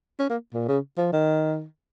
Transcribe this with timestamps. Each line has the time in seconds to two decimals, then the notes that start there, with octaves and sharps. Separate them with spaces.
0.19 C#4
0.30 A#3
0.54 A#2
0.68 C#3
0.98 F3
1.13 D#3